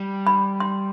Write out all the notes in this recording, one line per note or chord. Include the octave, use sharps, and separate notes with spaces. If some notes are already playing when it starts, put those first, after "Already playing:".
Already playing: G3
B5
C6